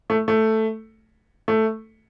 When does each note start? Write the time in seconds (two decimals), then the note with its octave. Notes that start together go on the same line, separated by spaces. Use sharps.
0.10 A3
0.28 A3
1.48 A3